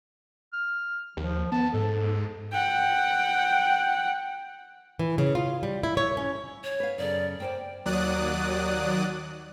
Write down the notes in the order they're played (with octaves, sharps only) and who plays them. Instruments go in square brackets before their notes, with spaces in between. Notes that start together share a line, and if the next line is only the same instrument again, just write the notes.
[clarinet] F6
[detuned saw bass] D#2 [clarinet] F3
[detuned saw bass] B3 [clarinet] A5
[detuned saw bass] G#2 [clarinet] A4
[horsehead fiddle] F#5 G5
[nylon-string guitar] E3
C#3
F4
G3
E4
C#5
C#4
[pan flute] C#5
[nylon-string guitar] B4 F5
[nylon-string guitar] F#2 C#3 A4 [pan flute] D5
[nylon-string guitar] A#3 C5 D5 [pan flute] G5
[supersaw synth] D#2 F#3 D5 D#6 F#6